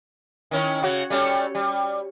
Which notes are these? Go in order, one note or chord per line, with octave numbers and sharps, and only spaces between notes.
D#3 C#4 E4
C#3 F#4
G3 A3 C#4
G3